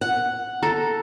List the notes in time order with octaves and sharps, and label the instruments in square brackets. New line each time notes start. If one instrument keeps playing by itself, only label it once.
[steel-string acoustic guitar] F#5
[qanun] A4 [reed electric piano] A#5